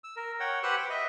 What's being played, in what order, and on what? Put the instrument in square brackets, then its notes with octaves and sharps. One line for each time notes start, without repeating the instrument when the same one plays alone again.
[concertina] E6
A#4
C#5 F#5 G5
G4 B4 C5 F#5 E6 F#6
G5
D#5 E5